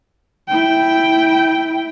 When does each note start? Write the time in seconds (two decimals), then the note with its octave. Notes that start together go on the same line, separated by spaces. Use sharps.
0.49 E4 G5